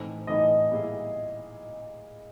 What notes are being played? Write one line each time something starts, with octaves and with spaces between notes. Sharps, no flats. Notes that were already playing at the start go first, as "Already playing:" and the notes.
Already playing: A2 E3 A3 C4 D#4
A2 E3 A3 C4 D#4 D#5
A#2 G3 B3 E4 G#4